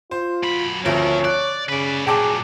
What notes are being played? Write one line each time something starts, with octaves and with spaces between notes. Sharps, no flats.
F4 C5
F#2 B5
G#1 D2 F3 C#4 A#4 C#5
D5 F#6
C#3 B4 D5
A#2 F#3 G#4 G5 A5 D6